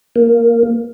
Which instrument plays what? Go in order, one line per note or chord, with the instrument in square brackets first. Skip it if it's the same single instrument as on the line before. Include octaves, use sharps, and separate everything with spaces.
[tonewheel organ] A#3